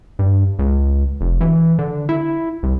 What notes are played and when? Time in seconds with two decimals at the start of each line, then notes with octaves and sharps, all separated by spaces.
0.19 G2
0.59 C#2
1.21 F1
1.41 E3
1.79 D3
2.09 E4
2.63 C2